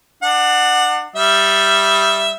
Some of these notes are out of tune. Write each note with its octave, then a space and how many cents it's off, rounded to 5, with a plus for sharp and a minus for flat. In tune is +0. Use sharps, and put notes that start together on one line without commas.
D4 +30 F#5 -5
G3 +0 E5 +0 D#6 +45